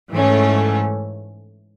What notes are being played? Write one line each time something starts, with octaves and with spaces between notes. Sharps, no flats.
G#2 E3 A3 C#4